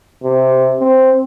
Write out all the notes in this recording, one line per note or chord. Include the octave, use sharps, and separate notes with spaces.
C3
C4